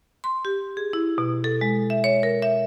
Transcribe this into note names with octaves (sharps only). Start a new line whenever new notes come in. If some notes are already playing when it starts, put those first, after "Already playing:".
C6
G4
G#4
E4
B2
A4
G#3
E5
C#5
A#4
E5